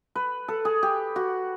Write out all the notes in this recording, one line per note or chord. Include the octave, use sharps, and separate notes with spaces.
B4
A4
G#4
G4
F#4